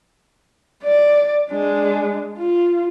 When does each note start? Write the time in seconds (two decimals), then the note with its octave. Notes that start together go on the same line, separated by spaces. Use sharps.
0.83 D5
1.50 G#3 D4
2.38 F4